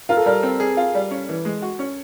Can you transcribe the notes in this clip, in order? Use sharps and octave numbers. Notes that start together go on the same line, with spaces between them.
F4 A#4
A4
G3 A#4
C4
G#4
F4
G3
C#4
E3
G#3
F#4
C#4